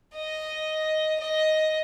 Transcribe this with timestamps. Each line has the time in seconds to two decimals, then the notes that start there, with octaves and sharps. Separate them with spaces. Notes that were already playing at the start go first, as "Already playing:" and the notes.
0.15 D#5
1.20 D#5